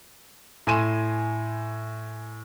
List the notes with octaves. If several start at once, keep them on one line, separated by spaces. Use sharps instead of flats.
A2 G#5 C6 D#7 E7